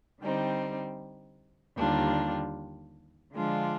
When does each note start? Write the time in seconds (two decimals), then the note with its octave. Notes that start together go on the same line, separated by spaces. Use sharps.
0.22 D3 G3 C4 D#4
1.77 D#2 D3 G3 D4 F4
3.33 D3 F3 G#3 D4 F4